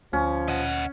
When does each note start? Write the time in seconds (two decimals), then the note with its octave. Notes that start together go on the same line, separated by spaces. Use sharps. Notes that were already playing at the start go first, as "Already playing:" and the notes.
0.13 D2 F3 C#4
0.48 D#5 F#5